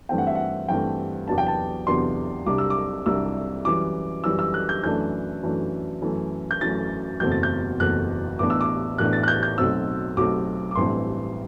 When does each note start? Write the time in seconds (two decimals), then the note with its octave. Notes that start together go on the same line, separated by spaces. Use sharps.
0.09 G2 E3 A3 C4 G5
0.18 F#5
0.27 E5
0.35 F#5
0.68 G2 E3 A3 C4 G5
1.28 E2 C3 F#3 B3 D4 A5
1.38 G5
1.47 A5
1.87 E2 C3 F#3 B3 D4 C6
2.46 C2 C3 G3 D4 D6
2.58 E6
2.70 D6
3.06 C2 C3 G3 D4 E6
3.65 F#2 E3 G3 D6
4.24 F#2 E3 G3 E6
4.39 E6
4.54 F#6
4.69 G6
4.84 F#2 E3 A3 D4 G6
5.43 F#2 E3 A3 D4
6.02 F#2 E3 A3
6.51 G6
6.61 F#2 E3 A3 A6
7.20 F#1 E2 B2 A3 C4 G6
7.32 A6
7.43 G6
7.80 F#1 E2 B2 A3 C4 F#6
8.39 A1 A2 E3 B3 D4 D6
8.50 E6
8.61 D6
8.98 A1 A2 E3 B3 D4 F#6
9.13 A6
9.23 F#6
9.28 G6
9.43 G6
9.58 B1 B2 F#3 A3 C4 E6
10.17 B1 B2 F#3 A3 C4 D6
10.71 D6
10.75 A1 G2 E3 A3 C4 C6